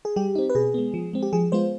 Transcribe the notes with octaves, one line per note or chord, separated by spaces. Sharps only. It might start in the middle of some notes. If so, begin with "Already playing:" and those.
G#4
G3 G4
C4 D#4
B4
B2 G#4
G#3 B3
F3
G#3 C4
G4
F3 G#4
G#3 B3 F4 C5